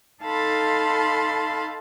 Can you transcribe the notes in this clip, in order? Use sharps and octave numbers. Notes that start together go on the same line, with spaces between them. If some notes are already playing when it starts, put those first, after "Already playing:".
D#4 A4 F5 A5 B5 C6